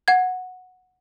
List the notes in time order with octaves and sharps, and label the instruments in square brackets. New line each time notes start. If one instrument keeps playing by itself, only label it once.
[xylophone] F#5 G#6